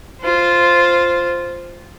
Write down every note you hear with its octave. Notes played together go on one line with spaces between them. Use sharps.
F4 C5